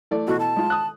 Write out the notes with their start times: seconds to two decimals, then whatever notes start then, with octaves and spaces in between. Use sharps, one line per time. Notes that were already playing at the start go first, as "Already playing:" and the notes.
0.11 E3 A3 D5
0.27 B2 E3 F#4 A4
0.40 A5
0.56 G#3 F4
0.70 D#6 F#6